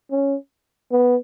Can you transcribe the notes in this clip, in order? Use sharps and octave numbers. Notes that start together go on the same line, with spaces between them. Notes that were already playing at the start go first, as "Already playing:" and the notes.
C#4
B3